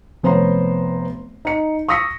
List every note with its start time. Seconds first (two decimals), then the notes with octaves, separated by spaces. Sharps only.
0.23 F1 B3 C5 C#5 A#5 C6
1.45 D#4 C#7
1.89 C#6 D#6 E6 A#6 B6 C#7